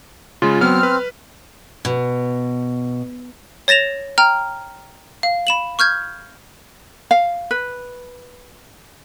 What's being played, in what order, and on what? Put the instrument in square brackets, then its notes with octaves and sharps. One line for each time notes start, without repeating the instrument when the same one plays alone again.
[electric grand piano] C#3 G#3 [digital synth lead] F4
[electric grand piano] F#3 B3 [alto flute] C4 [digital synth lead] F6
[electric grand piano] B4
[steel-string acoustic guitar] B2
[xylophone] C#5 A6 A#6 E7 F7
G5 A#5 F6
F5
B5 E7 F#7
C#6 F6 G6 G#6
[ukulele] F5
B4